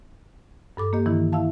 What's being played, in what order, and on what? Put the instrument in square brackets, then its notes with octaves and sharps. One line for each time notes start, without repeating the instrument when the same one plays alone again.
[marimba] G2 A4 D6
A#3 G4 D#5
G2 D#3 E3 E4
E4 E5 F5 A5